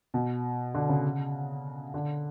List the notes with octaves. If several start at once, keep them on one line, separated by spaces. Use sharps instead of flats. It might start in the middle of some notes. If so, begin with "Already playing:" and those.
B2
D3
C#3
D3